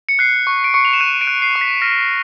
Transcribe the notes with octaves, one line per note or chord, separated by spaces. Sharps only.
C#7
F#6 C7
C#6
D7
C#6 C#7
F7
E7
F#6 D#7
D7
F#6
C7
C#6
B6
F6 A#6